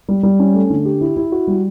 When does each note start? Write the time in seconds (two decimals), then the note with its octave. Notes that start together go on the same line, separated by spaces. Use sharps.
0.09 G3
0.23 G3
0.39 C#4
0.54 A3
0.70 D3
0.85 G4
1.01 E4
1.16 E4
1.32 F#4
1.47 G3